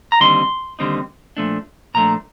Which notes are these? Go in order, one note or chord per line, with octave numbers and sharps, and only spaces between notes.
A#5
D#2 D3 G3 C4 D#4 C6
D#2 D3 G3 C4 D#4
A#2 F3 A3 D4
A#2 F3 A3 D4 A#5